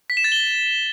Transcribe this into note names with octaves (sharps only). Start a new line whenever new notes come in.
B6
E7
A6
G7